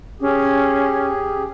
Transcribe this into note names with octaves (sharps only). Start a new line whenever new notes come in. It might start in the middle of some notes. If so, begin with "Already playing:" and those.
C#4 G4 G#4